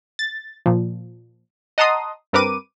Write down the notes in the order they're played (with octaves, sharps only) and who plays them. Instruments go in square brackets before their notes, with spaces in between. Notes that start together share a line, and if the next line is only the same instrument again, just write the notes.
[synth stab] A6
A#2 F3
D#5 F#5 A5 A#5 C6 D#6
G2 C4 A#4 B4 D6 D#7